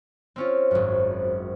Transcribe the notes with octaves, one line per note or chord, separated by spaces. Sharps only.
C4 C#4 F4
G#1 F#2